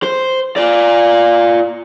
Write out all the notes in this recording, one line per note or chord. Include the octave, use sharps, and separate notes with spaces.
C5
F4 D5